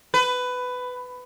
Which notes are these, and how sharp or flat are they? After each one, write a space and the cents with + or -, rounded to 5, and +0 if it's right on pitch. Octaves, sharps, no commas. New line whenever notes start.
B4 +15